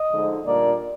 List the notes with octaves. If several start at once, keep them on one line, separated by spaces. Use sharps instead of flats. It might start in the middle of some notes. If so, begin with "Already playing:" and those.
Already playing: D#5
D3 F3 G#3 D#4
A#2 G3 A#3 D4 D5